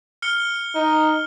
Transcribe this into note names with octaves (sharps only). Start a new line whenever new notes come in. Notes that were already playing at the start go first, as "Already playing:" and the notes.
F6 C#7 G7
D#4